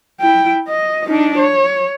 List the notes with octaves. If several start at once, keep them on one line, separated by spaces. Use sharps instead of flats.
E4 G5
D#5
D4 D#4
C#5